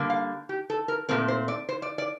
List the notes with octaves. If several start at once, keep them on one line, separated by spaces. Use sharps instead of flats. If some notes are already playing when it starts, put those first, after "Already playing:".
Already playing: D3 G3 A#3
F5
G4
A4
A#4
A#2 A3 C4 A#4
C5
D5
C5
D5
D5